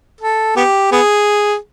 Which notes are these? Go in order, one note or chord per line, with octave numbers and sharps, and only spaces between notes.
A4
B3 G4
B3 G#4